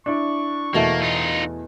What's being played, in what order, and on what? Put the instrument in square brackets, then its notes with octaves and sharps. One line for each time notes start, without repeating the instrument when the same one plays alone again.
[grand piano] D4 E4 D5 [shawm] C#6
[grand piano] E2 [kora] B2 A3 [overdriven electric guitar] A#3
[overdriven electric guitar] D#4 F4